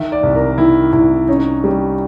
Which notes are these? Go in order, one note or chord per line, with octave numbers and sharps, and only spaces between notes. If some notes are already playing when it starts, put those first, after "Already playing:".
Already playing: D#3 E5
D5
C2
A#4
D#3 E4
C2 E4
C#4 D#4
G3